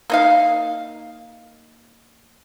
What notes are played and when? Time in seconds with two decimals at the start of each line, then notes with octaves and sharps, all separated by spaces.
0.10 A#3 D#4 F5